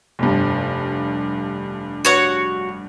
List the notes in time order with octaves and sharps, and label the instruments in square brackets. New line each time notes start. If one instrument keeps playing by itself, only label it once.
[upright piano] F1 G2
[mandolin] F#4 C#5 F#5